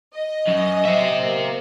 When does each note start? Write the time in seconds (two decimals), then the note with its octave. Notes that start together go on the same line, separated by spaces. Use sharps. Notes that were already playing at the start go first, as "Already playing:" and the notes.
0.14 D#5
0.47 F#2
0.85 C5 E5
1.23 A#3